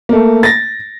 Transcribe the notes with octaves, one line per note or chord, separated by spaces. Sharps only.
A3 A#3
A6 A#6